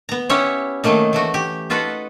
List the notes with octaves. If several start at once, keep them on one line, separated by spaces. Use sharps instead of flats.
B3 A#5
B3 C#4 E4 G4 C#5
D#3 F#3 A3 A#3 D#4
E3 A3 F#4
G4
D#4 F4 F#4 A4 B4 F#5